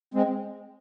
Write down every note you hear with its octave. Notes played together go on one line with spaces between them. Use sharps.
G#3 C4